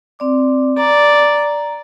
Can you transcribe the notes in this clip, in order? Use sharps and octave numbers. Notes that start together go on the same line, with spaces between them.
C4 D5 D6
D5 A#5